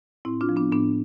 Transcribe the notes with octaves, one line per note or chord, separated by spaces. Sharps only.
A2 C4 E4
D4 F4
F3
B3 D4
A2 B3 D4